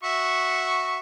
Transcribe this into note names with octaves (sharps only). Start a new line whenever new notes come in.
F#4 E5 C#6